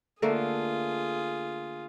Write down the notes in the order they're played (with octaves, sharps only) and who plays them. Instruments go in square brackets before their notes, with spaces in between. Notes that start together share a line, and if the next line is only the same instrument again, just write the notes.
[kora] D3 A3 A#3 [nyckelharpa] F4 G#4